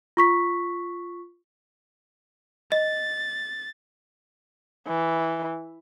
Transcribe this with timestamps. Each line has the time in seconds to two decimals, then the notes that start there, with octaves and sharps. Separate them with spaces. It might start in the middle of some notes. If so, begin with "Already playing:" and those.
0.17 F4 C#6 B6
2.72 D#5 A6
4.87 E3